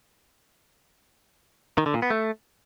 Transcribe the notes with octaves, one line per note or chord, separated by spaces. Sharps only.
D#3
D3
A#2
B3
A3